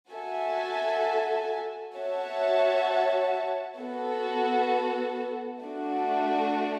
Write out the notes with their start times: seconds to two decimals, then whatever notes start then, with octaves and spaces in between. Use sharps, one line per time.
0.11 F#4 A4 E5 G#5
1.96 F#4 C#5 E5 A5
3.80 B3 F#4 A4
5.62 A3 D4 F#4